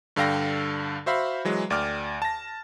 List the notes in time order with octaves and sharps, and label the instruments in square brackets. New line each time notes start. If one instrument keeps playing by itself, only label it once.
[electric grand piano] G2 D3 A4 F5 G5 A#6
F#4 C5 E5 F5 B5
E3 F#3 G#3
D2 D5 G5 D6 F6
A5 A#6